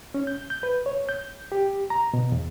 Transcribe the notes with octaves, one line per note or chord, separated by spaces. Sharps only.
C#4
G6
G6
B4
C#5
G6
G4
A#5
B2
E2